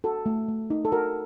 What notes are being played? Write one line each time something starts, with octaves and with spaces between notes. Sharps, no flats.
F#4 A4
A3
A3
D#4
A4
F#4 A#4